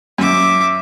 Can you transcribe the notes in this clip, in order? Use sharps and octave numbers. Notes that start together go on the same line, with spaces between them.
F#2 E5 D6